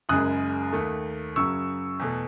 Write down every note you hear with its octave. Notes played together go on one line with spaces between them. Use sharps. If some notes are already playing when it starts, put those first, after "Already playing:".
F#1 F#2 C#3 G#3 D#6 F#6
D#2 D#3 A3
F#2 C#3 F#3 C#6 E6
E2 B2 A3